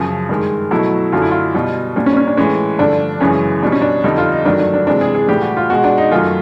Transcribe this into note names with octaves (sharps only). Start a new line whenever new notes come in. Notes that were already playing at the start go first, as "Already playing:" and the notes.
Already playing: F#2 C#3 F3
G2 D#3 G#3
B2 F#3 A3 E4
F#2 D3 F#3 A3 F4
E4
F4
B2 G3
A#2 G3 D4
C#4
D4
C#4
D4
A2 E3 G#3 C#4
G2 D3 F3 A3 D4
F#2 C#3 E3 G#3 C#4
B2 G3 D4
C#4
D4
F2 D3 G3 D#4
F4
D#4
G2 D#3 F#3 A3 D4
D4
D4
C3 E3 G#3 D4
G#4
G#4
A2 E3 G3 G4
F#4
F4
B2 G#3 F#4
D4
D#4
F#2 D#3 F#3 A3 F4